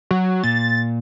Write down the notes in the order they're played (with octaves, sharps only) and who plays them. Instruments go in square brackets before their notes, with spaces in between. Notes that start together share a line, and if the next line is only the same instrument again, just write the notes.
[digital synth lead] F#3
[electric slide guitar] A#2 [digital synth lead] A6